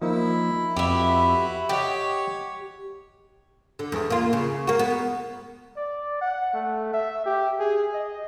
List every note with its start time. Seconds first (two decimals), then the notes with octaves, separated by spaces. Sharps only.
0.02 F3 A#3 D#4 E4
0.77 F2 E4 F#4 G4 B4 E5
1.69 G4 C#5 D#5 F#5 G5
3.79 D3
3.92 E2
4.10 A#3 F4
4.33 C#3
4.67 A#3 F#4
4.79 B3
5.77 D5
6.21 F#5
6.54 A3
6.94 E5
7.25 G4
7.60 G#4
7.94 D#5